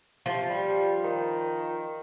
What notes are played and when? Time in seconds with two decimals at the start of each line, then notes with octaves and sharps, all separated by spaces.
0.26 C3 F3
0.50 G3
1.04 D#3